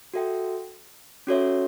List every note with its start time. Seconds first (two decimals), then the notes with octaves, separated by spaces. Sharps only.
0.14 F#4 A4 E5 G5
1.27 C#4 F#4 A4 C#5 E5